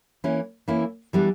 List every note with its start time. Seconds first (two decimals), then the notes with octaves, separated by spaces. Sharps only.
0.24 E3 A#3 C#4 E4
0.68 E3 A#3 C#4 E4
1.13 E3 G3 B3 D4